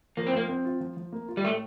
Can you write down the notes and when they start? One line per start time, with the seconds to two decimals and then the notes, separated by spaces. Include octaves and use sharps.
0.17 F3 A#3
0.27 C4
0.33 F3 A#3
0.49 C4
0.65 F4
0.80 F3
0.97 F3
1.12 A#3
1.28 F4
1.37 G3
1.44 A2 A3